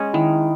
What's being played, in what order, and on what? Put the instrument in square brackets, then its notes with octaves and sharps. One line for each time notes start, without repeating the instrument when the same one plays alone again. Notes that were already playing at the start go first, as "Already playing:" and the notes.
Already playing: [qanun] G#3 C#4
[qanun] D#3 [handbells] E4